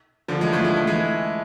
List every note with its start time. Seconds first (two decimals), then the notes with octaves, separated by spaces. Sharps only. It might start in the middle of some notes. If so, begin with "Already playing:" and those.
0.28 D3 F3
0.40 E3 G#3
0.52 F3 A3
0.64 G#3
0.76 A3
0.87 E3 G#3